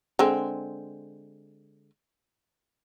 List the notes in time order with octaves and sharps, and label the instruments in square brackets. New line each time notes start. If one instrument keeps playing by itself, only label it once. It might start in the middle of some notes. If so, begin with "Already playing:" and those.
[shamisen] D3 G#3 C4